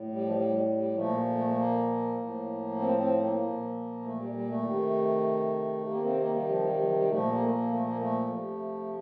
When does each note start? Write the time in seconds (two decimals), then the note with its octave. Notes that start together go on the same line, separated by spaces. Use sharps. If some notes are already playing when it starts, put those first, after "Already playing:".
Already playing: A2
0.12 G3
0.25 F3
0.33 G3
0.75 G3
0.94 A#2 F3 A3
1.35 A3
1.47 A3
1.56 A#3
2.18 A2 F3
2.79 C4
2.99 C4
3.20 A#3
3.41 A#2 F3
4.02 A3
4.10 F3
4.17 G3
4.32 G3
4.48 A3
4.63 C3 D#3
5.86 C3 D#3 A#3
6.02 C4
6.16 A#3
6.32 G3
6.48 F3
6.62 G3
6.78 F3
6.88 F3
6.94 G3
7.09 A#2 F3 A3
7.30 A#3
7.41 A3
7.50 A#3
7.71 A3
7.84 A#3
7.99 A3
8.32 C3 F3